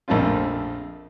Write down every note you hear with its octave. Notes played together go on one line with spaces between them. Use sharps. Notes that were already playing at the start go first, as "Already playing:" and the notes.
A#1 F2 A3 A#3 C4 F4